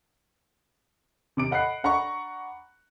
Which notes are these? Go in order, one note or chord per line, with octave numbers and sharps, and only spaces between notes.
C3 D6 D7
D#5 F#5 B5 F#6 C7
D4 F#5 A#5 B5 C#6